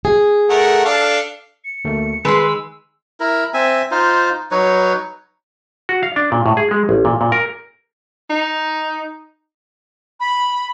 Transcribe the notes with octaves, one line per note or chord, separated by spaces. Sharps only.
G#4
A3 A#4 F#5
D4 A4 F5
C#7
D2 A3 A#3
D#3 G#3 B4 C6 E6
E4 A#4
C4 E5 G#5
D#4 F4 C5
F#3 D#4 B4 C#5
F#4
F5
D4
A#2
A2
G#4
G#3
A1
A#2
A#2
A#4
D#4
B5